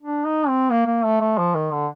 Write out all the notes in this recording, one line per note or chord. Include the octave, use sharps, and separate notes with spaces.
D4
D#4
C4
A#3
A#3
A3
A3
F3
D#3
D3